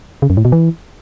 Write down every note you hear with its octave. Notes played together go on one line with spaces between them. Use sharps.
C#3
F#2
A2
B2
E3